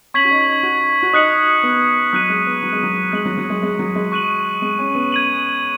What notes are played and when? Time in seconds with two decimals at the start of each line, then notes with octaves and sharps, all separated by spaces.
0.14 C#4 C#6 G#6 B6 F#7
0.25 F#4
0.31 D#4
0.47 D#4
0.63 F#4
1.03 F#4
1.13 D#4 D#6 F#6 C#7 F#7
1.63 B3
2.13 F#3 D#6 F#6 B6 D#7
2.29 G#3
2.47 B3
2.62 F#3
2.73 G#3
2.83 F#3
3.12 G#3 F#6 B6 D#7 F#7
3.25 F#3
3.38 F#3
3.50 G#3
3.63 G#3
3.79 F#3
3.96 G#3
4.12 C#6 F#6 D#7 F#7
4.62 G#3
4.79 C#4
4.95 B3
5.12 G#6 D#7 F#7